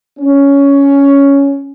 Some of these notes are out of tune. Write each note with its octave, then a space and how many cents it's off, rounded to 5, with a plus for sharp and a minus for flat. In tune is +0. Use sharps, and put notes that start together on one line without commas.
C#4 +10